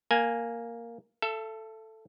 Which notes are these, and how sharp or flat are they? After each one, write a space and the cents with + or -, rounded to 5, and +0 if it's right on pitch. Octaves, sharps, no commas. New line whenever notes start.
A#3 +0 G#5 +0
A4 +0 E5 +35